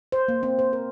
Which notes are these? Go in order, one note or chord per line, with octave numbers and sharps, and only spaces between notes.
C5
A#3
C4
C5
A#4